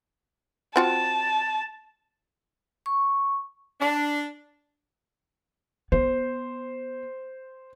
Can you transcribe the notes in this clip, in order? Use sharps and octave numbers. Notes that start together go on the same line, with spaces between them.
C4 F4 F#4 A5
C#6
D4
B3 C5